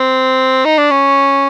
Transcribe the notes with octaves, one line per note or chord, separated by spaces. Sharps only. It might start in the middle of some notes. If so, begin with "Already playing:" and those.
Already playing: C4
D#4
D4
C#4